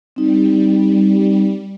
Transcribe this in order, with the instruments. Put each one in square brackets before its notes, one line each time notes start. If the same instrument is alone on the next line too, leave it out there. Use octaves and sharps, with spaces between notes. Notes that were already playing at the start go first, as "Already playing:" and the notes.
[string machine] G3 [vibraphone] C4 D#4